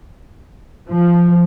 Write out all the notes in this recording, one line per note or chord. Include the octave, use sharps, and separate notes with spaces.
F3